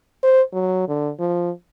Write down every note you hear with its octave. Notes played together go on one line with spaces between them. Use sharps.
C5
F#3
D3
F3